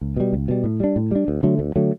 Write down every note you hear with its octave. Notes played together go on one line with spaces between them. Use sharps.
C#2
B2 G3
C#2
B2 G3
A2
G3 D4
A2
G3 D4
D2
D3 F#3 A3
D2
D3 F#3 A3